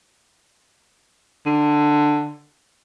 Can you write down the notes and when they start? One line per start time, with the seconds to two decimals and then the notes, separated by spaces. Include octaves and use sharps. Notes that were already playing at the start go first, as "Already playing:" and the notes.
1.46 D3